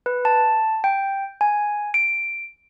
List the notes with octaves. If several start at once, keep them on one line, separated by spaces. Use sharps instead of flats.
B4
A5
G5
G#5
D7